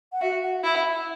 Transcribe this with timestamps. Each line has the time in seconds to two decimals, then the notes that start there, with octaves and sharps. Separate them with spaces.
0.12 F#5
0.21 F#4 E5
0.43 F#5
0.64 E4 E5